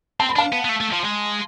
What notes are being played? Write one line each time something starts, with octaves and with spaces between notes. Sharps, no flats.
C4 A5
B5
D4 F5 A5
B3
B3
A3
A3
F3
G#3